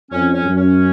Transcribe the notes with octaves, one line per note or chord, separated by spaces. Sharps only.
F2 C#4
C#4
F#2
C#4